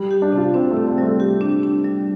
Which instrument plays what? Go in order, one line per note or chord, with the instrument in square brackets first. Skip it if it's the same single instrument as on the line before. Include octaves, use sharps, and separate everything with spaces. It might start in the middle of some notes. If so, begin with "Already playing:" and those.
Already playing: [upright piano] G3
[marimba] G4
[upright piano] D4
[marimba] C3 [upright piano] F4
[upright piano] C4 [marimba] D4
[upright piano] A3
[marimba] C3
[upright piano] C4
[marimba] G3
[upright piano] A3
[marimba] G4
D4
D4
G3